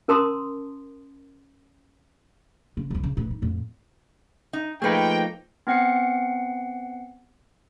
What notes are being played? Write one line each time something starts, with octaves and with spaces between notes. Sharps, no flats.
C#4 A#4 A5 A#5 C6 D#6
C#3
C2 F2
C#3
A2 E3
D#4
F2 A2
D#4
F3 A3 A#3 D#4 G#4 B4 G5
B3 C4 F#5 C7 C#7